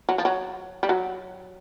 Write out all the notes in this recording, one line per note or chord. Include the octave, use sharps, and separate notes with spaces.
F#3
F3
F#3
G3
F#3